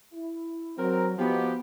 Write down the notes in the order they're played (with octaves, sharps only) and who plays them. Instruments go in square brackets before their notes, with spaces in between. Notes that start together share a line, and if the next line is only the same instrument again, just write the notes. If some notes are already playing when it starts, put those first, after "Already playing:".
[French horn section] E4
[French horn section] F#3 [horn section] C4 A#4
[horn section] F3 F#4 G4 [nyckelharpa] B3 [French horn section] D#4 B4